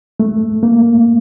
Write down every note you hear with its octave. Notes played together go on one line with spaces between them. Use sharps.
A3
A#3